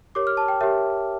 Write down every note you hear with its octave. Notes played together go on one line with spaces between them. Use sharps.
G4 A#4 C#5 D6
F6
A5
G5
G4 A#4 C#5 E5